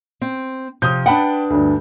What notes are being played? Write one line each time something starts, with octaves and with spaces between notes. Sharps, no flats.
C4
C3 F3 D#6 G6
D4 B4 F#5 G5 A5 B5
D2 G2